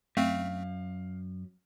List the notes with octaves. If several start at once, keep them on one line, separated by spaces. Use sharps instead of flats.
F#2 A3 C4 F5